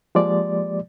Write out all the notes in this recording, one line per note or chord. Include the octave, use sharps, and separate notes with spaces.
F3 G#3 A#3 G4 D5